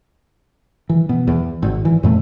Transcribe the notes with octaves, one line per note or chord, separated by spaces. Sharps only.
E3
B2
E2
G#1
E3
F2 A#2 A3